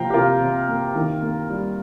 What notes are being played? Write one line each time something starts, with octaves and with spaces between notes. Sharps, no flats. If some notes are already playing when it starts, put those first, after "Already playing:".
Already playing: C3 F3 A#3 F5 G5 A#5
G4
C3 F4 A#4
C3
A#3
D#3
A#3
G3